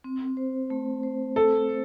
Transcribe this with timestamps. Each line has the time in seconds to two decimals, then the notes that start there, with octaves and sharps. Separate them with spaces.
0.04 C4
0.37 C5
0.70 A3
1.03 C5
1.36 C4 A4
1.70 C5